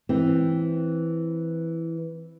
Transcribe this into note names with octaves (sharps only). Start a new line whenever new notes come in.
E3 C4